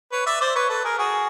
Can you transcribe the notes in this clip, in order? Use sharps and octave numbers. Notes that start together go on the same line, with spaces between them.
B4 C#5
D5 E5
C5 D5
B4 C#5
A4 B4
G#4 A#4
F#4 G#4